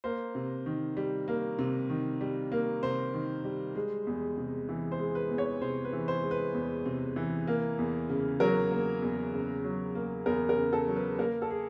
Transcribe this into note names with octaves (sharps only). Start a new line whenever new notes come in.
A#3 C5
C3
D#3
G3
A#3
C3
D#3
G3
A#3
C3 C5
D#3
G3
G#3
E2
C3
E3
C5
G#3
B4
E2
C#5
C3 C5
B4
E3
C5
G#3
B4
E2
C3
E3
A#3
E2
C#3
F#3 A#4
A#3
E2
C#3
F#3
A#3
E2 A#4
A#4
C#3
A4
F#3
B4
A#3 A#4
A4
G#4